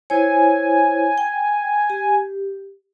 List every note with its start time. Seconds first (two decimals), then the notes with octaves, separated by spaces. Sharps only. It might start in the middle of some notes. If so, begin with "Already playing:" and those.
0.10 E4 C5 C#5 G#5
1.18 G5
1.90 G4